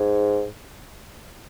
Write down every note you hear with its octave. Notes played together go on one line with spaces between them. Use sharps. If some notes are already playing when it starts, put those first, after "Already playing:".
Already playing: G#2